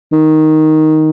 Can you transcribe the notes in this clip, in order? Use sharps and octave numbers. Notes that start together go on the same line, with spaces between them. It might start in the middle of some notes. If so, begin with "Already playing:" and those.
D#3